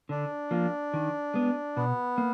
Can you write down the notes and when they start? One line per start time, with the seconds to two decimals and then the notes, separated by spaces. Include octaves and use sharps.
0.09 D3 D4
0.51 F3 A#3 F4
0.93 D#3
1.34 G#3 B3
1.76 B2 B3
2.18 A#3